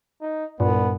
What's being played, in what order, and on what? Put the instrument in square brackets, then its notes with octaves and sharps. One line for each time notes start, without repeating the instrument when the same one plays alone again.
[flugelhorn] D#4
[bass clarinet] C2 [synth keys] G2 [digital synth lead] A#2 [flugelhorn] B3